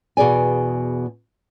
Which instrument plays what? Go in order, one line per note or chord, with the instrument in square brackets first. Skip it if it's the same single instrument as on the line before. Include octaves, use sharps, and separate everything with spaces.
[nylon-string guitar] E2 B2 G#4 D5 G#5